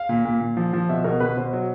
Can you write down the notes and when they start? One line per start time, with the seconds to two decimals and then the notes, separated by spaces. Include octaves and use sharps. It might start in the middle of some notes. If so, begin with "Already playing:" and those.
Already playing: F5
0.09 A#2
0.25 A#2
0.41 A#2
0.57 F3
0.73 F3
0.89 B2 E5
1.04 B2 A#4
1.20 B2 B4
1.37 B2 C5
1.53 F#3